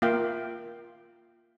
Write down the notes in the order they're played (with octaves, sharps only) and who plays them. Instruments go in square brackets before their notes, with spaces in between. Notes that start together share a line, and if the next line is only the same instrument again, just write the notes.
[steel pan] A#3 F4 E5 F5 G5